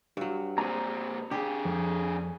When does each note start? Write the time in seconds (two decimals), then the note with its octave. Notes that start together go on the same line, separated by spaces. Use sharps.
0.17 G2 F#3
0.58 A#2 C4 G#4 A#5
1.31 D3 G4 G#4
1.65 F2